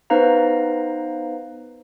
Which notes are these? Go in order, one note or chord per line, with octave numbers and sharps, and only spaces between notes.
B3 D#4 B4 C5 F5 A#5